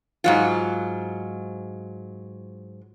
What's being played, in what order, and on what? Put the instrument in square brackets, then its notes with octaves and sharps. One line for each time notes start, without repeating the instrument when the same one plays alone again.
[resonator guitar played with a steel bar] G#2 F#3 F4